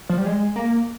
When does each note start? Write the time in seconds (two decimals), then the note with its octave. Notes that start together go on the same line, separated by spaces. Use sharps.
0.09 F3
0.18 G3
0.26 G#3
0.56 A#3